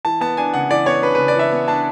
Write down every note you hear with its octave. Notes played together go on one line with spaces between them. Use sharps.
E3 A5
B3 A5
D4 G#5
C#3 F#5
E3 D5
B3 C#5
D4 B4
C#3 B4
D5
E3 E5
B3
D4 A5